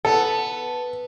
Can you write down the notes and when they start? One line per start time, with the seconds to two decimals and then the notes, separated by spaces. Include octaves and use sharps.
0.05 B3 A4